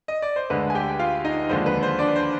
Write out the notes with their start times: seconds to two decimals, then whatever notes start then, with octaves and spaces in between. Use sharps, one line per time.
0.08 D#5
0.22 D5
0.36 C5
0.50 D2 D3 G#3 B4
0.70 G#5
0.75 G4 G5
0.99 F4 F5
1.25 D#4 D#5
1.49 D#2 D3 F3 G#3 C5
1.66 B4
1.83 C5
1.99 D4 D5
2.16 C5